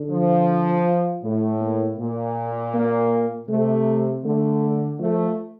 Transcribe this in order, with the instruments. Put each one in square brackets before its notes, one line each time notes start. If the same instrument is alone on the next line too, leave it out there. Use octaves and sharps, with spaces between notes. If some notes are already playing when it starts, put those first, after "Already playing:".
Already playing: [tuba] D3
[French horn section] F3
[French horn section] A2 [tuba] A3
[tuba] A#3
[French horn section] A#2 [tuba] A#3
[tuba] A#3
[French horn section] C3 [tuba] A3
[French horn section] D3 [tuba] A3
[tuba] F3 [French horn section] A3